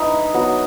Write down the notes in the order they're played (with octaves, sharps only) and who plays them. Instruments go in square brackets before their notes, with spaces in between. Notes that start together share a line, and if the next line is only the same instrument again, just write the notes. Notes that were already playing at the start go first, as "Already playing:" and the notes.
Already playing: [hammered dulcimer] D#4 [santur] E4 B4 E5
[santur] F#3 B3 F#4